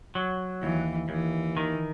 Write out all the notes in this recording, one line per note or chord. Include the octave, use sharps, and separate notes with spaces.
F#3
D#2 E3
D#2 E3
D#3